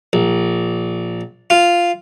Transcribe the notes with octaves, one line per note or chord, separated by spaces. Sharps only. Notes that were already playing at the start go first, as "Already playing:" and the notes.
A#1
F4